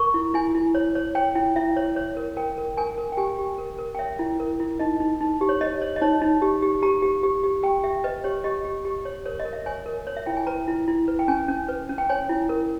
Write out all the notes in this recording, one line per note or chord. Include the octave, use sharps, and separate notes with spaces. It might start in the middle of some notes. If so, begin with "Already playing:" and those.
Already playing: A#4 C#6
E4
E4 G#5
E4
C#5
C#5
C#5 G5
E4 G5
E4 E5
C#5
C#5
A#4
A#4 G5
A#4
A#4 G#5
A#4
G5
G4 G#5
G4
A#4
A#4
G5
C#5 E5
E4
A#4
E4
D#4 D#5
D#4
D#4
G4
C#5
C#5 D#5
C#5
D#5
D#4 C#5
D#4
G4
G4
G4 A#5
G4
G4
G4
G4 G5
G4 E5
B4 D#5
G4 C#5
G4 D#5
G4
G4
C#5
A#4 C#5
D#5
A#4
E5
C#5 G#5
A#4
C#5
E5
E4 G5
G#5
B4 A#5
E4
E4
B4
G5
C#4 G#5
C#4
B4
C#4
G5
C#5 G#5
E4
A#4